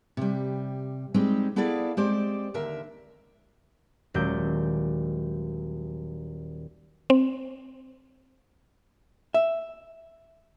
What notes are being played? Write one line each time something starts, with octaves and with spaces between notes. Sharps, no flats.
C3 G3
G3 G#3 C4 D#4 G4
B3 E4 G#4 A4 D5 F5
G#3 C4 G4 C5 D5
D#2 D3 A#4 E5
D#1 F#3 G#3 D6 G6
C4
E5